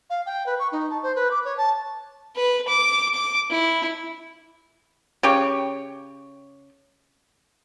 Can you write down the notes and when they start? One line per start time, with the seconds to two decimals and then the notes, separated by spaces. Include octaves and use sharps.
0.10 F5
0.26 G5
0.46 B4
0.59 C#6
0.72 D#4
0.90 A5
1.03 C5
1.16 B4
1.31 D6
1.45 C#5
1.57 A5
2.36 B4
2.68 D6
3.14 D6
3.51 E4
5.23 C#3 G4 C#5